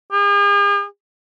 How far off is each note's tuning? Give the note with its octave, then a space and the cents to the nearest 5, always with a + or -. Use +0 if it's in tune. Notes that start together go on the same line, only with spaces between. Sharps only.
G#4 -45